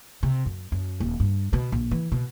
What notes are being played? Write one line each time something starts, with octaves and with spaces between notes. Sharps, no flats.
C3
F#2
F#2
D#1
G2
B2
A#1
E3
B2